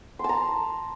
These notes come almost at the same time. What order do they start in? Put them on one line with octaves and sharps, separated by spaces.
C6 A5 A#5